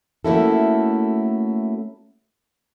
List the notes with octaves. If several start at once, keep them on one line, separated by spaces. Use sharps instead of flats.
A3 A#3 C#4 E4 F#4 A4